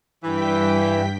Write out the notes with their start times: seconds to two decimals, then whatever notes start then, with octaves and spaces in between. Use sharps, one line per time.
0.23 G2 E3 G5 B6